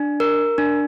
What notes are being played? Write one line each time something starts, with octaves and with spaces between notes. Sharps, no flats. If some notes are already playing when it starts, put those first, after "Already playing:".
Already playing: D4
A#4
D4